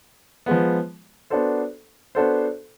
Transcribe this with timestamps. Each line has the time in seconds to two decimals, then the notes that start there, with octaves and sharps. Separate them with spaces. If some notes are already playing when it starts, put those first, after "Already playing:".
0.46 F3 G#3 B3
1.30 B3 D4 F#4 A4 C5
2.15 B3 D4 F#4 A4 C5